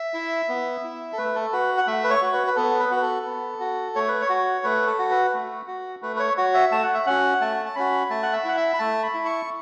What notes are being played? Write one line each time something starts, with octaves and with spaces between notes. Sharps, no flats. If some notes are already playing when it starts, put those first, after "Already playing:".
Already playing: E5
E4
B3
E4
A4
A3 B4
A4
F#4 B4
F#5
A3 E5
B4
C#5
F#4
B4
B4
B3 A4
B4
F#4 B4
A4
B3
F#4
A3 C#5
B4
C#5
F#4
A3 B4
A4
F#4
B4
A3
F#4
A3 B4
B4
C#5
F#4 C#5
E5
A3 A5
F#5
E5
C#4 F#4 F#5
A3 A5
A5
C#4 F#4 B5
A3 A5
F#5
E5
E4 F#5
E5
B5
A3 A5
B5
E4
C#6